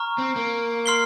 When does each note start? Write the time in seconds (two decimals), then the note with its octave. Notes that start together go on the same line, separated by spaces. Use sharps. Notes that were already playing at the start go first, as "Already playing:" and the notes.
Already playing: A#5 C#6 F6
0.18 C4
0.36 A#3
0.86 C6 F6 C7 G7